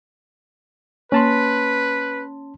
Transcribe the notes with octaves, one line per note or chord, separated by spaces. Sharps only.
A#3 C#4 B4 A5 C6